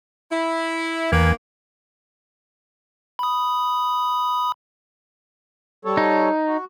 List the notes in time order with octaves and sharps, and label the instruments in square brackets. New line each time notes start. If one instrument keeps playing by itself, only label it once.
[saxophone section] E4
[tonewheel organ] E2 G#5 [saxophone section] D#3 A#3 B4
[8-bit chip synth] B5 D#6
[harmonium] G3 A4 C#5
[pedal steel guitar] D#4
[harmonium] F#4